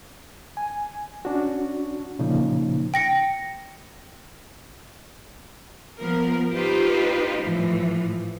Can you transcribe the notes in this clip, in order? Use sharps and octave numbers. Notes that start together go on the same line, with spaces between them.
G#5
C#4 D4 F#4
A#2 C#3 F3 A#3 D#4
G5 A#6 C#7
F3 B3 A#4
D#4 F4 G4 B4 C5
A2 E3 F3